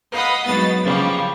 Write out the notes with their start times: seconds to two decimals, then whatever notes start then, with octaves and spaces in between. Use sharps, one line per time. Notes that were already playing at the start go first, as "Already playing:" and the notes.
0.12 D#5 F5 F#5 B5 D#6
0.46 F#3 G#3 B3 D#4 B5 A6
0.84 C#3 F3 G3 A#3